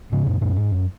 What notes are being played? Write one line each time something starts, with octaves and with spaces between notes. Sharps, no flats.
G#2 C#3
F#2 A#2
F#2 A#2
G#2
F#2